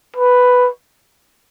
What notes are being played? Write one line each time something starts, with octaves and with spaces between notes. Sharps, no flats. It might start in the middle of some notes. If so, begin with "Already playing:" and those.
B4